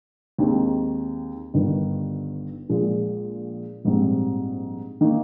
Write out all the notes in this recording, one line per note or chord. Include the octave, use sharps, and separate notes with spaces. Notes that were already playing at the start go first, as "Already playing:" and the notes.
D#2 D#3 G#3 C4
G1 G2 D#3
A#1 A#2 G#3
A#1 G#2 G3 C4
D#3 A#3 D#4